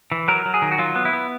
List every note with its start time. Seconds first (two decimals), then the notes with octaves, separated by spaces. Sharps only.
0.12 E3
0.28 F#3 A#4
0.46 F#3
0.54 G#4
0.62 D#3
0.72 F#4
0.78 F#3 F4
0.95 B3
1.05 E4
1.13 B3